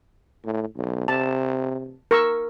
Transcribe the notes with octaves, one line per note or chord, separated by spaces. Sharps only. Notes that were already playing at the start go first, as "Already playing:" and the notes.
A2
B1
C3 A5
A#4 C#6 E6